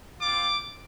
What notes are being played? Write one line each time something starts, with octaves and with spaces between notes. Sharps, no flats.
C4 F4 D6